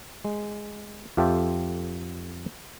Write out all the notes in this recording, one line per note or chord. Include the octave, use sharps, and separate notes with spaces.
G#3
F2 F4 G4 A4 E5 G5